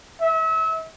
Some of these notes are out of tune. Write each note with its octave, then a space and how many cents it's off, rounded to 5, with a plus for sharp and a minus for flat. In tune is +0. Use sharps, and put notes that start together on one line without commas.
E5 -35